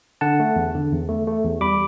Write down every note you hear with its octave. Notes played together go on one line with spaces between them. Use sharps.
D3 F#5 A5
A3
E2
D3
E2
A3
A3
E2
G3 B5 D6